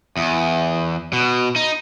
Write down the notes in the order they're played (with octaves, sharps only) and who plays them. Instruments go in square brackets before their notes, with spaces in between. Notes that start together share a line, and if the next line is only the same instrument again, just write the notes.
[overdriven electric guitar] E2
B2
D#4